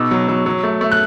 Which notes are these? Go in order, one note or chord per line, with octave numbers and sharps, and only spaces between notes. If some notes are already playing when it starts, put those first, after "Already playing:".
Already playing: B2 D#4 D6 E6
F#3
F#3
F#3
A3
A3
F#6